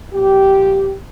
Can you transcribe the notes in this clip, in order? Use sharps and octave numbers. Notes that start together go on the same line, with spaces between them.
A#2 F3 G4